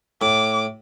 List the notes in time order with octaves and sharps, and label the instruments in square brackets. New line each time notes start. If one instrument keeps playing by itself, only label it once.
[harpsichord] A2 [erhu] D6